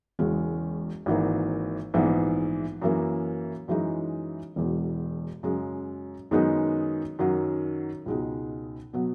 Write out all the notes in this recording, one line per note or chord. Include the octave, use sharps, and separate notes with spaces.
E1 E2 C#3 G#3 C#4
G#1 G#2 E3 A#3
A#1 G#2 E3 B3
F#2 E3 A#3
F#2 E3 G#3 D#4
E1 E2 B2
F#2 C#3 G#3
F#2 D#3 G#3 B3 D#4
F#2 D#3 F#3
C#2 B2 G#3 D#4
B2 F#3 B3